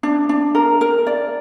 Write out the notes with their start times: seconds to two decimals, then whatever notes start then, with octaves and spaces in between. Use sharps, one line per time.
0.03 D4
0.29 D4
0.55 A#4
0.81 A#4
1.07 D5